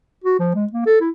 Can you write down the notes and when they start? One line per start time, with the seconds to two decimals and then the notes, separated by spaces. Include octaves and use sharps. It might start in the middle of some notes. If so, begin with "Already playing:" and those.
0.24 F#4
0.39 F3
0.55 G#3
0.72 A#3
0.86 A4
1.01 E4